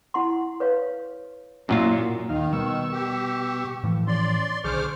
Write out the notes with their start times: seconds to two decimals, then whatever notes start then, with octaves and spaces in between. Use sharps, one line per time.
0.14 E4 F#5 C6
0.60 B4 C#5 F5
1.69 F#2 A#2 F#3 C#4 E4 F4 E6
2.29 D#2 D#3 D#4 F5
2.53 B2 G3 C#6 E6
2.92 G4
3.83 A2 E3 F3
4.07 C#4 D5 C6
4.64 B1 D3 G#4 C5 C#6 D6 F6